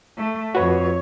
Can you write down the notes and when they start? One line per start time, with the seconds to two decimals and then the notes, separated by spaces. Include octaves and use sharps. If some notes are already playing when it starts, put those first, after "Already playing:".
0.18 A3
0.55 F2 F#4 B4 C#5